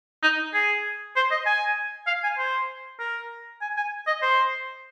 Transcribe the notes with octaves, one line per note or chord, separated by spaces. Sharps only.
D#4
G#4
C5
D#5
G#5
F5
G#5
C5
A#4
G#5
G#5
D#5
C5